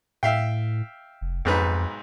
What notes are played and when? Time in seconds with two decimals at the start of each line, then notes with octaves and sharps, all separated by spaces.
0.23 A2 E5 F5 G5
1.21 F1
1.45 B1 F2 G#2 B4